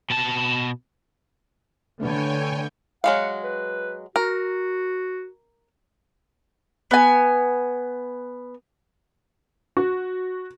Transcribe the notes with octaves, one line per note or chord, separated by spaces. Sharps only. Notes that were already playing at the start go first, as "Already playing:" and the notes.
B2 A5
D3 A3 D4 B4 C#5 G5 G#5
F#3 G#3 F5 F#5
B4
F#4 A#4
B3 G#5
F#4